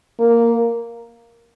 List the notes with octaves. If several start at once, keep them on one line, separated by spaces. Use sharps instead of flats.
A#3